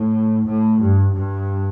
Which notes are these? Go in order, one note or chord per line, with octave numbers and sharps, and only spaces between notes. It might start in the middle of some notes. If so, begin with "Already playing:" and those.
Already playing: A2
A2
G2
G2